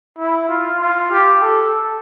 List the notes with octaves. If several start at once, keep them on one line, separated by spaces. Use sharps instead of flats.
E4
F4
F4
G4
A4